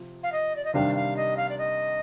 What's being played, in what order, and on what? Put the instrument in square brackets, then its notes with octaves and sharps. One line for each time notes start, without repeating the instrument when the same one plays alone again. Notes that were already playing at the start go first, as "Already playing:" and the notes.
Already playing: [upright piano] C3 F3
[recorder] F5
D#5
D5
D#5
[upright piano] C3 D#3 G3 D4 [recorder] F5
[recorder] F5
D#5
F5
D5
D#5